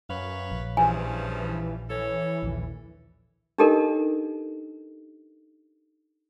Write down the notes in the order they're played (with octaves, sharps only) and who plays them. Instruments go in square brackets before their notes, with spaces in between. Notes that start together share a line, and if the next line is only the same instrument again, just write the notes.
[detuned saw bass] F#2 [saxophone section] B4 C#5 F5
[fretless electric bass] A#1
[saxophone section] G2 C#3 F3 [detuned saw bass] E3 [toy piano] G#5
[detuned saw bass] E3 [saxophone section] C#4 A4 C#5
[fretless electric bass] A#1 D#2 A#2
[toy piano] D4 D#4 G4 A4 A#4 D#5